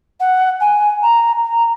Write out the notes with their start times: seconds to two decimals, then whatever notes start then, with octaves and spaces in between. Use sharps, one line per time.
0.20 F#5
0.60 G#5
1.02 A#5
1.43 A#5